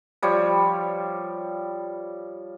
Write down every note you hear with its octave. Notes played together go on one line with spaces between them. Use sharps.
F3 G3 C#5